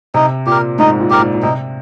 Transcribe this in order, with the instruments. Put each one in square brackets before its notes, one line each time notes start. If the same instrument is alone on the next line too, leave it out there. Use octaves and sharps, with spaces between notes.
[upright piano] C3 [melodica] D#4
[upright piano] A#2 [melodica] G4 A#4
[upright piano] G#2 [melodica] D#4
[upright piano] A#2
[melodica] G4 A#4
[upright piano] A#2
A#2
[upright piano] C3 [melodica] D#4